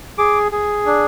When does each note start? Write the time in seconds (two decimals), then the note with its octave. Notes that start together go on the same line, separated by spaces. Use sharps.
0.18 G#4 D6
0.52 G#4
0.86 D4